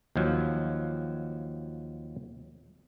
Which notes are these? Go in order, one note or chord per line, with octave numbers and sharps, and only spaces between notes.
D#2 F3 F#3